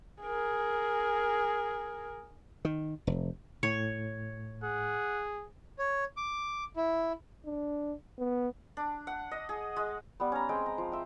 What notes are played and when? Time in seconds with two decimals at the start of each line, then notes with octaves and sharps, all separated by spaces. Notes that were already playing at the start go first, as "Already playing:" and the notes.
0.22 G#4 A#4
2.65 D#3
3.07 F1
3.63 A2 C#5
4.63 G#4 F#5
5.79 C#5
6.17 D6
6.76 E4
7.45 D4
8.18 B3
8.77 D4
9.07 F#5
9.31 D#5
9.49 G#4
9.76 G#3
10.20 G3 B3
10.32 C#4 A#5
10.49 G#3 C4 G5
10.66 A#5
10.78 F3
10.92 E5 G5